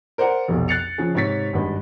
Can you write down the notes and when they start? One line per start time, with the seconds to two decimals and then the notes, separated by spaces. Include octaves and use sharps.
0.18 A#4 C5 D5 F#5
0.48 F1 B1
0.68 F#6 A6 C7 C#7 F7
0.98 C#3 F3 C#4 G#4
1.15 G#2 C3 C#5 A6 B6
1.53 G#1 G2 G#3 B4